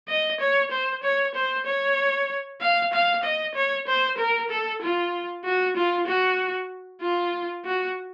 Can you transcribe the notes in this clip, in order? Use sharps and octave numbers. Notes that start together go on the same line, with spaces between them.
D#5
C#5
C5
C#5
C5
C#5
F5
F5
D#5
C#5
C5
A#4
A4
F4
F#4
F4
F#4
F4
F#4